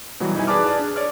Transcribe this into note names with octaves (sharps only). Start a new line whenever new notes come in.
B2 E3 F#3 G3
D#4 E4 B4 G#5
G#4 B4 D5 A5 D6 F6
G#4 D5 A5
D4
C#5 D5 D6 F6